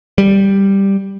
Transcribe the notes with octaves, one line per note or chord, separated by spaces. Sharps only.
G3